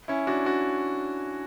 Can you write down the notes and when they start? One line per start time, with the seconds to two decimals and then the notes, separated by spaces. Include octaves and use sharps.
0.08 C#4 E4
0.27 D4 F#4
0.45 D4 F#4